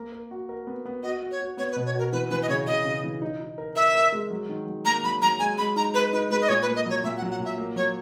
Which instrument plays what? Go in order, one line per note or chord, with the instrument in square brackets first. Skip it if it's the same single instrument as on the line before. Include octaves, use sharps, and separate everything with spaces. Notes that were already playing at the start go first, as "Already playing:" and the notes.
Already playing: [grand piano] A#3 A#4
A#4
F#4
A#4
B3
B3
[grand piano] F#4 [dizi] D#5
[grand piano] F#4
[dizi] C#5
[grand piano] F#4
[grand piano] B3 [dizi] C#5
[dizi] B4
[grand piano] B2
[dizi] C#5
[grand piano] F#4 [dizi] A#4
[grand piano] E3 [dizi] B4
[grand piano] E3 [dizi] B4
[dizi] D#5
[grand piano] C#3 [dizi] C#5
[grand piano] C#3 [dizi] D#5
[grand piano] C#3
E3
D#4
D#4
A#4
[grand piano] A#4 [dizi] E5
[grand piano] A#4
G#3
F#3
D#3
F#3
[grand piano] A#3 [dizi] A#5
[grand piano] F#3 [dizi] B5
[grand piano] F#3 [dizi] A#5
[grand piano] G#3 [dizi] G#5
[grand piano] G#3 [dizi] B5
[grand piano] D#4 [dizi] A#5
[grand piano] G#3 [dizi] B4
[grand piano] D#4 [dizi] B4
[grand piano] G#3 [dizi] B4
[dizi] D#5
[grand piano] A#2 [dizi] C#5
[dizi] B4
[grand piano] A#3
[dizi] D#5
[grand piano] F#3 [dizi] C#5
[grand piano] A#2 [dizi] E5
[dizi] F#5
[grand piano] F#3
[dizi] F#5
[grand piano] A#2
[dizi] E5
[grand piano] A#3
[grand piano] F#3 [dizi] C#5